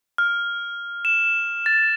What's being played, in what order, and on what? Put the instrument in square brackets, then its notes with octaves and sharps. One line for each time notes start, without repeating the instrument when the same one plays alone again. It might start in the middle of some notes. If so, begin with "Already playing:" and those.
[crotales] F6
E7
A6